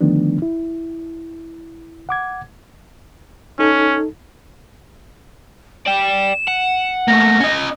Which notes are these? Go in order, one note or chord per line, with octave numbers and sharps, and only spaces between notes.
D3 D#3 F3 A3 B3 D4
E4
F#5 D6 G#6
C#4 D#4 A4
D5 G5 E7
F#5
A3 A#3 A#6
C#4 D#5